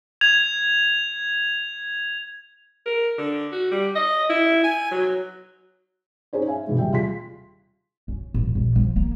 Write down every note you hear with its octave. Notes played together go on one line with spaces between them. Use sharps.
G#6 F7
A#4
D3
F#4
G3
D#5
E4
G#5
F#3
C#4 D#4 G#4 C5 C#5
E5 F5 G#5
B2 E3 G#3
D#1 C3 E5 G5
F4 G#4 C6 B6
C#4
D1
A#1
F3
A#3